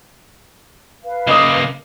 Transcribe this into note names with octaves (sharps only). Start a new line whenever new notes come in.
B4 F5
C#3 A#3 D#5 D6 D#6